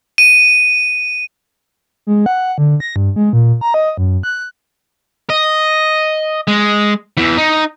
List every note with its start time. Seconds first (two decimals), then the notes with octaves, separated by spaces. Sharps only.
0.18 D#7
2.07 G#3
2.26 F#5
2.58 D3
2.80 A#6
2.96 G2
3.16 G#3
3.33 A#2
3.61 A#5
3.74 D#5
3.98 F#2
4.23 F#6
5.30 D#5
6.48 G#3
7.17 E2 E3
7.37 D#4